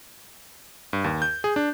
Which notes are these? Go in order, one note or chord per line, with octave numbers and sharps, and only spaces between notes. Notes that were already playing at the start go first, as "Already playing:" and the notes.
G2
D#2
G6
G#4
D4